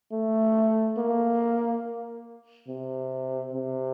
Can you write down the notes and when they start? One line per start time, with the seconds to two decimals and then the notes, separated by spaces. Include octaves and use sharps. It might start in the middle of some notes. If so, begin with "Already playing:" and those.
0.12 A3
0.97 A#3
2.68 C3
3.53 C3